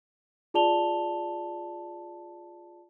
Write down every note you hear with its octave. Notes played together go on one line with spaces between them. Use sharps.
F4 G#4 D5 A5 F7 G7